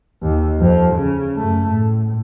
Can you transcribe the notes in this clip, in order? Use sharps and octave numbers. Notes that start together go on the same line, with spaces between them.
D#2
F2 F3
C#3
F#2 A3
A2